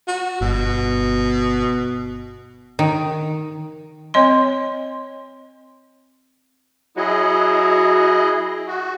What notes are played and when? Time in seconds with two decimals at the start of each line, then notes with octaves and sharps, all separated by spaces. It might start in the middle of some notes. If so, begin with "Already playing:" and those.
0.08 F#4
0.41 G1 B2
2.79 D#3
4.14 C4 C#5 D#5 C6
6.97 F#3 E4 G#4 D#5
8.67 F#4